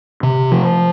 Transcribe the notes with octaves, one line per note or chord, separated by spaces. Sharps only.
C3
F3